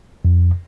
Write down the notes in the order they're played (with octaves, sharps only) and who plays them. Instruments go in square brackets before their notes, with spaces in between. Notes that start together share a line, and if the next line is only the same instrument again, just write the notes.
[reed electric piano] F2